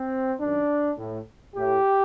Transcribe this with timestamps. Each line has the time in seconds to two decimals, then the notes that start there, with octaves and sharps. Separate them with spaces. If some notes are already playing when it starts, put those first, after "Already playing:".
Already playing: C4
0.40 F#2 D#3 D4
0.98 A2
1.55 A2 G4